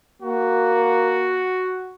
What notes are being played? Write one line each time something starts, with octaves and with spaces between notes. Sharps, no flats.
A#3 F#4